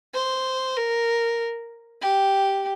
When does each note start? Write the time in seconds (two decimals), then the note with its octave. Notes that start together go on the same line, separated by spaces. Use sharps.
0.15 C5
0.77 A#4
2.02 G4